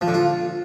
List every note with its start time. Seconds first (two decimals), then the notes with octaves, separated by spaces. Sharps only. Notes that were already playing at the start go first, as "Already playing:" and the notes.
0.01 F3
0.08 D3
0.14 F4